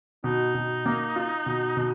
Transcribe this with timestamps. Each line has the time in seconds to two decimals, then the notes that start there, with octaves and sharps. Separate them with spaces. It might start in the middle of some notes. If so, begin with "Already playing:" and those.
0.24 B2 D#4
0.54 B2
0.86 A#3
1.16 F4
1.46 B2
1.77 B2